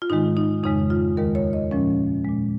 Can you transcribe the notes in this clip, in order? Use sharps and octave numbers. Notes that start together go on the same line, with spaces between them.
F4
G#2 D#3 G#3 D#4
D#4
F2 C#3 G#3 D#4
F4
D#2 D#3 G#3 A#4
C#5
D#5
A#2 F3 G#3 C#4
A#2 G#3